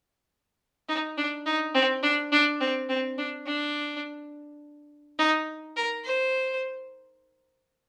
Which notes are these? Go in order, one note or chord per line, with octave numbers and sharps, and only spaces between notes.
D#4
D4
D#4
C4
D4
D4
C4
C4
D4
D4
D#4
A#4
C5